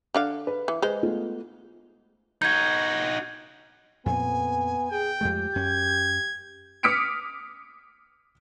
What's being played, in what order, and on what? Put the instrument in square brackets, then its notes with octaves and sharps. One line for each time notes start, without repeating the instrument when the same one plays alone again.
[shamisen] D3 D4 F5
[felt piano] B4
[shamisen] E3
[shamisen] G#3 C5 [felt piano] B4
[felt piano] A3 B3 F4
[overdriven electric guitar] D#4 F#4 [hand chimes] G6 G#6
[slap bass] F2 A#2 C4 [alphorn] B3 [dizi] G#5
[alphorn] G#4 [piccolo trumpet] G5
[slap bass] F2 G#3 A3 [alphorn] G4 [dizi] G6
[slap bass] F#2 C#4 [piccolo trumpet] G#6
[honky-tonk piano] D6 D#6 F6 B6 C#7 D7